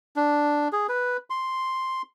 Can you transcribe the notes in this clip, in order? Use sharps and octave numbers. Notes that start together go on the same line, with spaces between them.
D4
G#4
B4
C6